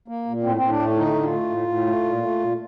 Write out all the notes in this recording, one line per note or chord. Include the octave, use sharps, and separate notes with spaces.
A#3
A#2
A2 C4
A2 C4
D4
A3
D3 D#4
D3
F4
A3
A2
A2
A3
A#2
A3
A#2